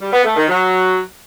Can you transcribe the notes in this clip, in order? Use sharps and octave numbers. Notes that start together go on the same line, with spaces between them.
G3
B3
A3
D#3
F#3